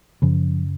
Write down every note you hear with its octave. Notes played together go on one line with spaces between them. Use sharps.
F#2 C#3 F3